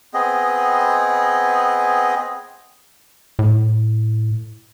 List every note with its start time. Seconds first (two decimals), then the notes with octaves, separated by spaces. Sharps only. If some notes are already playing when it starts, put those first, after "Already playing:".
0.14 B3 C4 G#4 D#5
3.39 A2